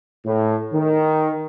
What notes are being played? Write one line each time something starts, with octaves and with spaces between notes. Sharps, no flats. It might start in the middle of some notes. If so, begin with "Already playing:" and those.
A2
D#3